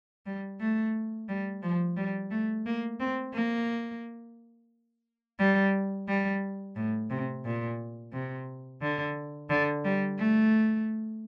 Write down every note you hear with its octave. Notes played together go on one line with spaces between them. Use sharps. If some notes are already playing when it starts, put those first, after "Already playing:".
G3
A3
G3
F3
G3
A3
A#3
C4
A#3
G3
G3
A2
C3
A#2
C3
D3
D3
G3
A3